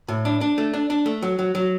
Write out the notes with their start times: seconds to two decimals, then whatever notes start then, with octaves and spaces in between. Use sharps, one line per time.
0.08 A2
0.25 D4
0.41 D4
0.58 A3
0.74 D4
0.90 D4
1.06 A3
1.22 F#3
1.39 F#3
1.55 F#3